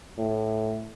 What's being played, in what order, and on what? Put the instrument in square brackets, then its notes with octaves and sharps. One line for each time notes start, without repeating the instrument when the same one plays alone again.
[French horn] A2